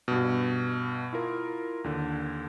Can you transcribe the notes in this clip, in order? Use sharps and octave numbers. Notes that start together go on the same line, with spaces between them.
G2 B2
E4 F4 A#4
D#2 D3